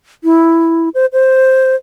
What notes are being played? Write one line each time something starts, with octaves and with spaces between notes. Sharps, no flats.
E4
C5
C5